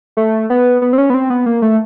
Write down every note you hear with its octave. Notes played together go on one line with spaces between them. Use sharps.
A3
B3
B3
C4
C#4
B3
C4
B3
A#3
A3